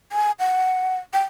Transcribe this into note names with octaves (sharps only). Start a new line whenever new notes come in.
G#5
F#5
G5